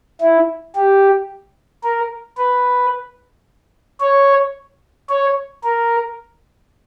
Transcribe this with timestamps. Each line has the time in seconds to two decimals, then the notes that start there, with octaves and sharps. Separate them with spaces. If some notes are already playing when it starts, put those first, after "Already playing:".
0.21 E4
0.76 G4
1.84 A#4
2.38 B4
4.00 C#5
5.09 C#5
5.64 A#4